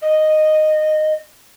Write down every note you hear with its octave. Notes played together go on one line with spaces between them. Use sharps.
D#5